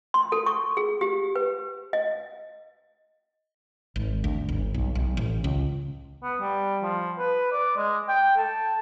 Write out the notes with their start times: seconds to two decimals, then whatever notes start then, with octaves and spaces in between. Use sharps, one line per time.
0.14 C6
0.32 A4
0.46 C#6
0.77 G#4
1.01 G4
1.36 B4
1.93 D#5
3.96 G#1
4.24 D2
4.49 G1
4.74 B1
4.95 B1
5.17 A1
5.44 C#2
6.23 B3
6.40 G3
6.82 F3
7.19 B4
7.52 D5
7.77 G#3
8.08 G5
8.37 A4